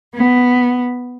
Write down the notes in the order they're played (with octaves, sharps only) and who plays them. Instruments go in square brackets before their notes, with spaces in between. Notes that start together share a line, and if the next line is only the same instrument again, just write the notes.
[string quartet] B3